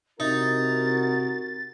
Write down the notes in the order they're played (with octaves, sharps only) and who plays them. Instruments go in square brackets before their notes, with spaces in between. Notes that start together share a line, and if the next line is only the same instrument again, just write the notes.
[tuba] C3 [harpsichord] D#4 [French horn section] E4 F#4 A#4 [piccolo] A6